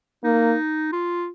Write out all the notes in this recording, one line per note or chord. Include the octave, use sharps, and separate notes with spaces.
A#3 D#4
F4